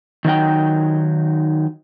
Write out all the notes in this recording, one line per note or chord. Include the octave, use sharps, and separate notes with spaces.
D#3 F#3 D#4 G5